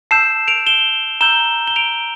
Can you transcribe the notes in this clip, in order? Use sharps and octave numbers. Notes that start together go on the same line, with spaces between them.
A5 E6 G6 C7 E7
D7 F7
E7 G7
A#5 E6 G6 E7 G7
G7
D7 F7